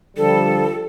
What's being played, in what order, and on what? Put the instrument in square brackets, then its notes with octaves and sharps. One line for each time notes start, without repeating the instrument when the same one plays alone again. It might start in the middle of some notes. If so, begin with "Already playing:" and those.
[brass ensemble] D3 F3 G3 [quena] A4